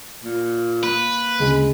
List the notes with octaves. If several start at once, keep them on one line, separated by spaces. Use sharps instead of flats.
A#2
A#3 B4
D2 C#3 G#3